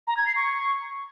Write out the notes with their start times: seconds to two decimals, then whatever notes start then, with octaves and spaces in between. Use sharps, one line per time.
0.07 A#5
0.17 G#6
0.26 C7
0.36 C#6